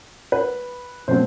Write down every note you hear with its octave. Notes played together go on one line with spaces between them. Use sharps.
B4
B2 F#3 A3 C4 C5